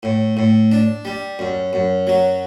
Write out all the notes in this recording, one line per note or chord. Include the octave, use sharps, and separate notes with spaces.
A2
A2
D4
G3
F#2
F#2
F#3